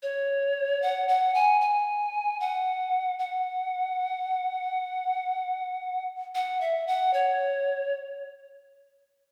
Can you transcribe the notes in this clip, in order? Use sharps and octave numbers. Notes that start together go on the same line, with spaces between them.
C#5
F#5
F#5
G#5
G#5
F#5
F#5
F#5
E5
F#5
C#5